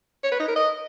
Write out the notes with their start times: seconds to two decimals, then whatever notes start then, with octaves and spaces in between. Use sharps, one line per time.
0.23 C#5
0.32 B4
0.40 D#4
0.48 A#4
0.56 D#5